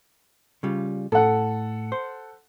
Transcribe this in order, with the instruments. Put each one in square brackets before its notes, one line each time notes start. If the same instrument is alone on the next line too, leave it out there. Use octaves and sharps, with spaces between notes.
[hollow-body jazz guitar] C#3 G3 F4
[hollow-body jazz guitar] A2 [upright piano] A4 F#5
[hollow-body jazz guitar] C5